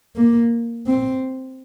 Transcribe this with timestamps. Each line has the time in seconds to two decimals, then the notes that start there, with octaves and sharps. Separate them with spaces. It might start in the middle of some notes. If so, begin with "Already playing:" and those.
0.16 A#3
0.87 C4